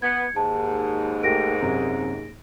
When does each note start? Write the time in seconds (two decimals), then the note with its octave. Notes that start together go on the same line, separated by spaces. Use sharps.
0.02 B3 G#6 C#7
0.36 D#2 G#2 A5
1.23 A3 G4 A#4 A#6 D7
1.62 F#2 C3